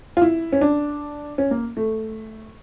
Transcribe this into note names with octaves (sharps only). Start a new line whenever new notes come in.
F4
E4
C#4
D4
C#4
A#3
A3